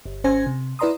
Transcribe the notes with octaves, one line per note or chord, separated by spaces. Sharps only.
G1
G#1 C#4 C5 G#5 G#6 A#6
C3
E4 B4 D5 A#5 C6 D#6